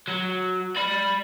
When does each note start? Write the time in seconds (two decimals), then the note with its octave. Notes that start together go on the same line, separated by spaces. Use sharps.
0.08 F#3
0.76 D5 B5